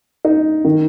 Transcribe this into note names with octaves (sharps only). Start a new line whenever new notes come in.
D#4
D#3